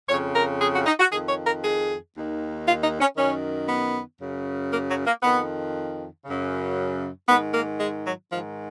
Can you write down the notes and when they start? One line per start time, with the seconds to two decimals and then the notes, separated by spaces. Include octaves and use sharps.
0.09 F2 C#5
0.13 C#3
0.35 A#4
0.60 G#4
0.73 F#4
0.86 D#4
1.00 F#4
1.12 F2 D#3 G#4
1.29 C#5
1.46 A#4
1.64 G#4
2.15 D#2 D#3
2.67 F4
2.84 D#4
3.00 C#4
3.17 F#2 D#3 C#4
3.68 B3
4.20 F#2 C#3
4.72 A#3
4.89 F#3
5.06 A#3
5.22 F2 D#3 B3
6.25 F#2 C#3
7.28 G#2 D#3 B3
7.54 A#3
7.80 G#3
8.06 F#3
8.31 G#2 D#3 F3